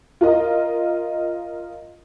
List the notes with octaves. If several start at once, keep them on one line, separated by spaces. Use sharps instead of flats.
F4 A#4 D#5